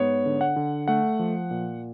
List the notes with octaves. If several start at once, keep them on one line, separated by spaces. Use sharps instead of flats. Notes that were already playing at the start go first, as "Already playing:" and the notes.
Already playing: G#2 B3 C#5
D3
F#5
D3
A3 F#5
F3
A#2